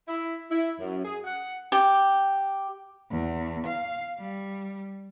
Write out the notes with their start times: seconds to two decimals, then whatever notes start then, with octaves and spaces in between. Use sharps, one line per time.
0.07 E4
0.50 E4
0.80 F#2
1.05 G#4
1.24 F#5
1.72 G4
3.10 E2
3.66 F5
4.18 G3